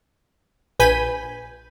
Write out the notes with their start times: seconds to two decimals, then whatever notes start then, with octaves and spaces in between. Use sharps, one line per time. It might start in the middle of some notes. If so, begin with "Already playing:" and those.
0.79 A#1 B4 G#5 G6 B6 D#7